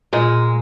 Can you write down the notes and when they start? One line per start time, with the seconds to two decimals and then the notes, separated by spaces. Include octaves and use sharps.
0.13 A#2 G#3